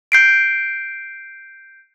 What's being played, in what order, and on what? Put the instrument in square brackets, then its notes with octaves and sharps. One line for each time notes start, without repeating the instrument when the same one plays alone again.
[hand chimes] G6 C7 D7